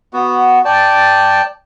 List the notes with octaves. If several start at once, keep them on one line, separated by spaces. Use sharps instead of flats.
B3 F#4
D5 G5 A5